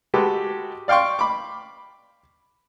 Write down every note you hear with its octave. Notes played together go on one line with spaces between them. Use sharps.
G#3 F#4 G4 A4 B4
D5 F5 G5 C6 C#6
B5 D6